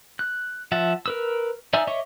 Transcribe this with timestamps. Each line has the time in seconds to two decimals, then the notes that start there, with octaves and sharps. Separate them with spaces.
0.19 F#6
0.72 F3 E5 F#5 A5
1.06 A#4 B4 E6
1.73 D#4 D5 E5 G#5 E6
1.87 C#5 D#5 E5 C#6 D6